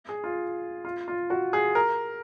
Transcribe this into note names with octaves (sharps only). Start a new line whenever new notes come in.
G#4
F4
F4
F4
F#4
G#4
A#4